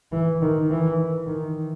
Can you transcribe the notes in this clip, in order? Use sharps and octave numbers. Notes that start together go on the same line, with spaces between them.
E3
D#3
E3
D#3